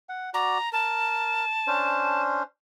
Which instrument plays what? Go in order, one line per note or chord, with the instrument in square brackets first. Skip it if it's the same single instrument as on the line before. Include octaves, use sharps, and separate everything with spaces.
[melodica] F#5
[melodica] F#4 D5 [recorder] A#5
[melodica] A#4 [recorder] A5
[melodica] C#4 D4 C5